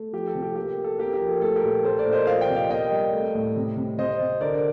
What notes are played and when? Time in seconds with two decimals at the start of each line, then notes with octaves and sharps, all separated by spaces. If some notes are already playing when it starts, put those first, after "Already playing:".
Already playing: A3
0.13 F3 G4
0.27 A4
0.35 C3
0.42 G4
0.56 A#3 G4
0.77 A#3
0.84 A4
0.98 A#3 G4 A#4
1.14 G4 A#4
1.21 F3
1.28 A4
1.42 A3 A4
1.56 G4 A#4
1.63 A#2
1.84 A3 A4 C5
1.99 A#4 D5
2.06 A#2
2.12 C5 D#5
2.27 F3 D5 F5
2.41 D#5 G5
2.49 C3
2.56 D5 F5
2.69 A#3 D#5 G5
2.92 G3
3.12 A3
3.35 A2
3.56 C3
3.76 C3
3.98 C3 C5 D#5
4.20 C3
4.41 D3 A#4 D5